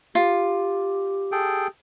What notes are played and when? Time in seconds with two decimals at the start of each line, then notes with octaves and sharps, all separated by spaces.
0.15 F4 G4
1.32 G#4 A4 G5